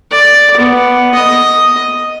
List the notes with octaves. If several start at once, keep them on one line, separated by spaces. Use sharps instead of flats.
D5
B3
D#5